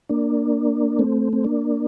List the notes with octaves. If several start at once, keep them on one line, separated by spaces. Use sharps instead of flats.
A#3 D4
A3 C4
C4
A#3 D4